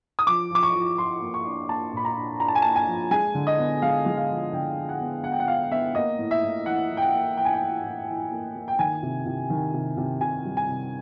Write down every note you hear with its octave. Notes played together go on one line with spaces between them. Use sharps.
D#6
F3 D6
F3 D6
C#6
F3
F3 C6
A#3
C#6
D4
A#3 A5
A#2 B5
A#5
D4
D4 A#5
A5
G#5
A#3 A5
G#5
F3
G#3 G#5
D3
D#5
B3
G#3 F5
G#3
F5
F3
D3 G5
F3
F#5
B3
B3 F#5
G5
F#5
B3 F5
B3 E5
A#3 D#5
A2
E5
A2
E3 F#5
E3
G5
F#5
A#3
E3 G5
G#5
G5
E3
A2
E3
A#3
A#3
G5
D#3 G#5
C3
C3
D#3
C3
C3
C3 G#5
G3
G#5
C3